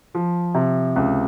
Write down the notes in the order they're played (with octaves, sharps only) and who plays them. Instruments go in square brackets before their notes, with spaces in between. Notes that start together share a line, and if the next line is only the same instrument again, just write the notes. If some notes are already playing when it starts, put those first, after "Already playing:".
[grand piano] F3
C3
C#2